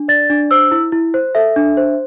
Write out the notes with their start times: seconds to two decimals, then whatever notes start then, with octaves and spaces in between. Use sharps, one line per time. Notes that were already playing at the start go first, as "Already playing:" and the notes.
Already playing: D4
0.08 D5 A6
0.30 D4
0.51 C5 E6
0.71 E4
0.92 E4
1.14 C5
1.35 A4 E5
1.56 D4
1.77 C5